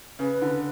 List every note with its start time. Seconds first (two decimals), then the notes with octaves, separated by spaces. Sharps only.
0.19 C#3 B4
0.42 D3